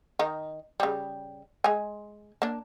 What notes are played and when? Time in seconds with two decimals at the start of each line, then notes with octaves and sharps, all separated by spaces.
0.19 D#3 D#4
0.80 C#3 G3
1.64 G#3 G#5
2.42 A#3 D4